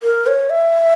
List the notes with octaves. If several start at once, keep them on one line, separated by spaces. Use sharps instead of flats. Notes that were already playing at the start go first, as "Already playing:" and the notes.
A#4
C#5
E5